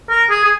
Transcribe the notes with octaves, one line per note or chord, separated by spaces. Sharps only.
A#4
G#4
G#4